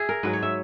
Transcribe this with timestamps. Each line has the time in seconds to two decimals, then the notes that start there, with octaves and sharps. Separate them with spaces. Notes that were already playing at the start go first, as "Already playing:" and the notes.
Already playing: G#4 E5
0.09 A#4
0.23 G#2 F#3 B4
0.33 C#5
0.43 E5